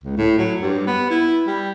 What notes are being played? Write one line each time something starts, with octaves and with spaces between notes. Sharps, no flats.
C#2
A2
F#3
G2
B3
E4
G3